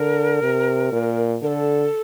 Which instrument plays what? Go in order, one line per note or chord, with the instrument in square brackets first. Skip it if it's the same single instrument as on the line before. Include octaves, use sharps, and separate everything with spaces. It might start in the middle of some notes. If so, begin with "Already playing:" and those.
Already playing: [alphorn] D3 [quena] A#4
[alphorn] C3
A#2
[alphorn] D3 [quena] A#4
[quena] A4